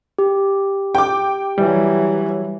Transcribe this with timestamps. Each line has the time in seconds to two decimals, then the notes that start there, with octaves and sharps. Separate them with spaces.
0.18 G4
0.95 G5 D6
1.58 E3 F#3 G3